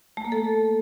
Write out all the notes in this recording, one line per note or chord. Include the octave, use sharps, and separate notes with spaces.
A3
A#3
A4